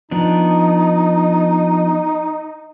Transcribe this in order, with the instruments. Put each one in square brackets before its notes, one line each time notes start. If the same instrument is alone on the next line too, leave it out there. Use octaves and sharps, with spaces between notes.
[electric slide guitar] F3 B3 D4 [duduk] D#4